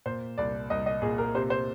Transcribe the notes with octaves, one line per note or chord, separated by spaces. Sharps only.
A#2 C5
C2 D5
C2 D#5
D#5
A#2 G#4
A#4
C3 C5
C5